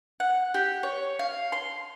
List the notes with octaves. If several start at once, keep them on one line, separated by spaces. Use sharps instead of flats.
F#5
G4
C#5
F5
C6